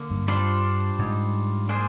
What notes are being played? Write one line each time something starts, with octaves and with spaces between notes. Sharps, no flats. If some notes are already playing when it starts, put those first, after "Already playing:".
Already playing: D3 A#3
G2
G3 D4 F4 C5
G#2
A#3 D4 G#4 C5